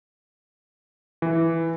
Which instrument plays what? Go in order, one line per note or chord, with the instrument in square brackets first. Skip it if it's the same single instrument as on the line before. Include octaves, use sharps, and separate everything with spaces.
[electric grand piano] E3